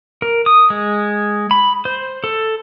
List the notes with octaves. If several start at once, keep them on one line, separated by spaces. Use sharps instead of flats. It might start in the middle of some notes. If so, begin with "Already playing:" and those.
A#4
D#6
G#3
B5
C5
A4